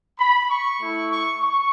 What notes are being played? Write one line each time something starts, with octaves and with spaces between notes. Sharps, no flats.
B5
C#6
A3 E4
C#6
C#6